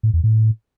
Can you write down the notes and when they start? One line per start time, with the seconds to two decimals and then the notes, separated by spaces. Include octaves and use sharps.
0.03 A2
0.13 E2
0.24 A2